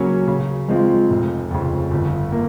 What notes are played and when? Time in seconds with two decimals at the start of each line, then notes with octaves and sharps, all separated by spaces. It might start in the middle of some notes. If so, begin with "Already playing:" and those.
Already playing: C#3 F#3 A#3 C#4
0.28 C#3
0.68 F3 G#3 C4 F4
1.10 F1
1.51 F2 C#3
1.91 G1
2.32 A#3